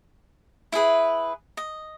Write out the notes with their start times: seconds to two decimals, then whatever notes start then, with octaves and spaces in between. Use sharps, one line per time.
0.72 E4 G#4 B4 E5
1.57 D#5